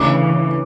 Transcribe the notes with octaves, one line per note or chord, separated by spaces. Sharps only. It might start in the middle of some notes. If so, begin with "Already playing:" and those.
Already playing: D2 C#3 E3 D6